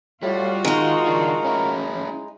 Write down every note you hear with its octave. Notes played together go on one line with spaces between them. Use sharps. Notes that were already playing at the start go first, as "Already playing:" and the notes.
A2 G3 F4 F#4
D#3 G#3 D#4 A#4
D#3 D4
C#4 E4